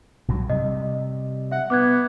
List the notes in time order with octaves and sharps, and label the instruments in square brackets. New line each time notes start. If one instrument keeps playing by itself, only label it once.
[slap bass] B1 G2 F#3
[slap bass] C3 G3 [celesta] D#5
[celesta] E5 [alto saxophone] F#5
[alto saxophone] B3 [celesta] D6 F#6 G#6